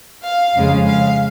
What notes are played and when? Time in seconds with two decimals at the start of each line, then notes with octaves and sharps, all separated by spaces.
0.23 F5
0.55 F2 C#3 G#3
0.87 F5